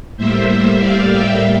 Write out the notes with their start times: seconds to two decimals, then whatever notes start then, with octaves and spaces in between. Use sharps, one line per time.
0.17 A2 G3 A#3 C5 E5
0.49 C5 E5
0.80 D5 F5
1.12 E5 G5